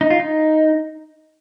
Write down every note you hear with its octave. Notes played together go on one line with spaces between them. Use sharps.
D#4
F4
D#4